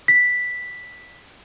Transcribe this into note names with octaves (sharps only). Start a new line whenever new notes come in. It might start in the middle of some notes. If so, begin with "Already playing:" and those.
B6